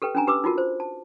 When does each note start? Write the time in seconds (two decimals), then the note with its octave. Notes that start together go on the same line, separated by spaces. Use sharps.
0.02 G4 A4 B4 G5
0.15 C#4 D4 G#5 A#5
0.27 G4 B4 D6 E6
0.44 D#4 F4 F#4 A#4
0.58 C5
0.80 A5